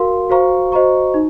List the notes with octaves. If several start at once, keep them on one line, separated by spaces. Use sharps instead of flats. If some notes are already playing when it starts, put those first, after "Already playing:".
Already playing: F#4 A#4 F5 C6
F#4 C5 F5 A#5 C#6
F#4 C5 D#5 A#5 C#6
D#4